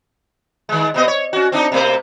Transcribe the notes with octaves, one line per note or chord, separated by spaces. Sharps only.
D#3 G#3
C3 B3 D#5
C#5
C#4 F#4
C4 D4 D#4
C3 A3 C5